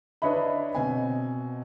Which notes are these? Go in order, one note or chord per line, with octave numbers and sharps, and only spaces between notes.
D4 B4 C#5 D#5 E5 B5
B2 C4 G#5